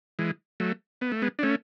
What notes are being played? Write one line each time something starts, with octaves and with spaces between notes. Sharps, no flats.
E3 G#3
F#3 A3
B3
A3
G#3 B3
D4
A3 C#4